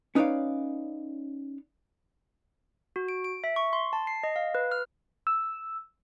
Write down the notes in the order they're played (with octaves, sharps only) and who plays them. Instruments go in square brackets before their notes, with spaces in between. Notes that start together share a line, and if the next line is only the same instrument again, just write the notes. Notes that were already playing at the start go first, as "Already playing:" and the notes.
[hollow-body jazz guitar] C#4 D#4 B4 C#5 D5 F5
[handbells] F#4
D7
D7
E5
C#6
C6
A5
C7
D#5
F5
B4
F6
[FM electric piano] E6